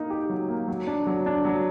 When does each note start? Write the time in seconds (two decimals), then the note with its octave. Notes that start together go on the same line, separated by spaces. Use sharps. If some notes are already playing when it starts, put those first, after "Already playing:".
Already playing: A#3 D#4
0.10 G4
0.29 F#3
0.49 A#3
0.68 F#3
0.87 D4
1.07 F#3
1.26 D4
1.45 F#3